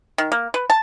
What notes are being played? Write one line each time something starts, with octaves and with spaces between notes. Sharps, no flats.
D#3
A#3
B4
A5